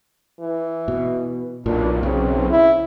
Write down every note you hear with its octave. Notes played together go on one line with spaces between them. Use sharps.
E3
B2
B1 A#2 D4
C#3 C4
E4